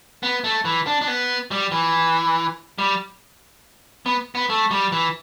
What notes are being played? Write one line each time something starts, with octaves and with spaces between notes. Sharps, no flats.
B3
A3
E3
D4
D4
B3
G3
E3
G3
B3
B3
A3
G3
E3